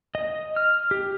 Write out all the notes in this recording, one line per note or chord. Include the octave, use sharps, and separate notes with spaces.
D#5
F6
G4